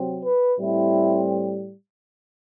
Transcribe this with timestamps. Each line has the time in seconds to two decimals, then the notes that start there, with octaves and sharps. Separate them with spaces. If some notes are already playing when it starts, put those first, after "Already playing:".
Already playing: C3 F#3 C4
0.24 B4
0.59 A2 G3 C4 E4